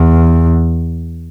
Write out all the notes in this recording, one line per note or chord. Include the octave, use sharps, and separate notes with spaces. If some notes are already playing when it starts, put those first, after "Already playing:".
Already playing: E2